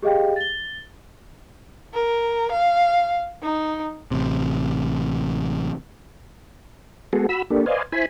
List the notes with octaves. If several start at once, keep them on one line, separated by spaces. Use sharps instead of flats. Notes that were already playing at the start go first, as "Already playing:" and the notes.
G4 G#4 D#5 F5 G5
A6 G7
A#4
F5
D#4
A1 C3
G#3 B3 F#4 G#4 A4
F#4 B5 E6
A#3 D4 G4 A4
B4 C5 D5 D#5 F5 G#5
E4 C5 G#5 B5